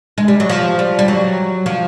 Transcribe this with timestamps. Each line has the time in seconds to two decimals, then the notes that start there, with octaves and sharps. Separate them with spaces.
0.18 G#3
0.28 G3
0.40 F#3
0.49 F3
0.79 G3
0.99 G3
1.08 F#3
1.66 F3